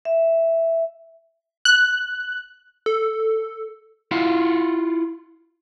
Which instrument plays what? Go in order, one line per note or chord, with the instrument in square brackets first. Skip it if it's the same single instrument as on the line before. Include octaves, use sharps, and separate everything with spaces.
[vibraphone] E5
[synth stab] F#6
[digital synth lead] A4
[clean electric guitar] E4 F4 F5 F#5